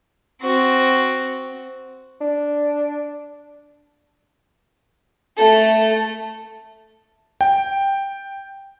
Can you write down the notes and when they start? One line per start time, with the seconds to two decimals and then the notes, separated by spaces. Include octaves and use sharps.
0.42 C4 F#4
2.21 D4
5.37 A3 A4
7.41 G5